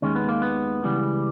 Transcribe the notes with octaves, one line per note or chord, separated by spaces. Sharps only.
D#2 D#3 G#3 C#4
B3
A#3
B3
C#2 C#3 E3 G3